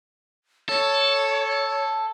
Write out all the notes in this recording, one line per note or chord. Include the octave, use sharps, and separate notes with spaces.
A4 C#5